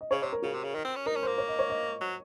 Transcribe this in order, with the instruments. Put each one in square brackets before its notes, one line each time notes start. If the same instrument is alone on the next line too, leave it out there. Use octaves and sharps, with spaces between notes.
[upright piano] D#5
[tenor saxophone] C#3 [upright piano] C#5
[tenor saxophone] C3 [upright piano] C#5
[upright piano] A#4
[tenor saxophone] C#3 [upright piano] F#4
[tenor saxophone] C3
C#3
D#3
C4
C#4
[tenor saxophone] D#4 [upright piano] A#4
[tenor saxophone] C#4
[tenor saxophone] A#3 [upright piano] C5
[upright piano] C#5
D#5
C#5
D#5
[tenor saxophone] F#3